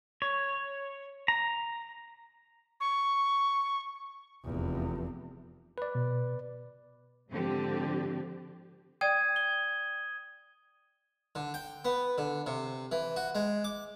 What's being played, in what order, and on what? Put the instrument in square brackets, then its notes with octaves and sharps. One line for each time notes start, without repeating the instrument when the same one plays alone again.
[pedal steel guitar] C#5
A#5
[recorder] C#6
[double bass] F1 E2
[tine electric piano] B4 D5
[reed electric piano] B2
[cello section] G#2 D3 F3 C4 G4
[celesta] D5 G5 [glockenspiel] D#6 G#6 D#7
[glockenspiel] G7
[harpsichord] D3
G5
B3
D3
C3
E3
F#4
G#3
D6